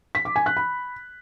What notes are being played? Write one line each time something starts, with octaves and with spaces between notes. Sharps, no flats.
B6
D6
G#5
F#6
B5